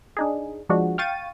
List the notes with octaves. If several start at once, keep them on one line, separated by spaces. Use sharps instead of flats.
D4 D#4 G#4
F3 G#3 D4 F#4
F5 G5 C#6 A6 D#7